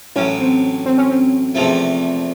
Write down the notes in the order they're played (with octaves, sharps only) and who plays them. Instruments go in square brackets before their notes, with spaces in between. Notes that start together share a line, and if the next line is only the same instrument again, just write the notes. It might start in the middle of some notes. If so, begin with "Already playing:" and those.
[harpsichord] A1 A2 F#3 [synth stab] C#4
[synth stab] C4
C4
C#4
C4
[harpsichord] E2 C3 F3 A3